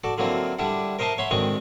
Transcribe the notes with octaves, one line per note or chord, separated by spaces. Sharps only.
F#4 A4 D5
D3 F#3 A#3 C4 E4 F4
D3 G3 D4 E4 F#5
A#4 C5 D#5 E5 A5 C6
C#5 E5 F#5 B5 C6
D2 D#3 G#3 C4 C#6